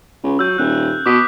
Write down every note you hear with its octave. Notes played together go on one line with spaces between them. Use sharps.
C#2
F#3 E6 G6
D#1 F#6
B2 D6 D#6 B6